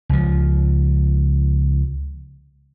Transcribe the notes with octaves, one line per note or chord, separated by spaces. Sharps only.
C#2 F3